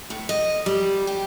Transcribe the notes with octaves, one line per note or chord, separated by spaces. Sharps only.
A2
D#5
G3
G4